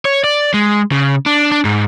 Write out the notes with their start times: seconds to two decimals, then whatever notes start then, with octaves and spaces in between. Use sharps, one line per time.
0.05 C#5
0.24 D5
0.54 G#3
0.92 C#3
1.26 D4
1.52 D4
1.65 G#2